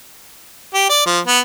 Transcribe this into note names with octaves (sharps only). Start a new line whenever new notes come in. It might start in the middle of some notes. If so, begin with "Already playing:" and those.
G4
D5
F3
B3